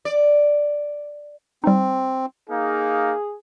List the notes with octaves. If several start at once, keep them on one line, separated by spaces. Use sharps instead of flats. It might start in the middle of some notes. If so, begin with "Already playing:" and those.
D5
G3 C4 D#4
A#3 D#4 G#4 F5